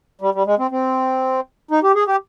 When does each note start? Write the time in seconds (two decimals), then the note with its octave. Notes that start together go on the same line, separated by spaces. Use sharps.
0.21 G3
0.34 G3
0.46 G#3
0.59 C4
0.71 C4
1.71 D#4
1.83 G4
1.95 G#4
2.07 G4